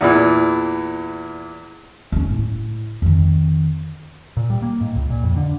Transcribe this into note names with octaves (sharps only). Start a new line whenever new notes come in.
E2 A#2 E3
D#1 C#4
A2
F2 D#3
A#2
G3
A#3
G#2
C#2
A#2
F2
D3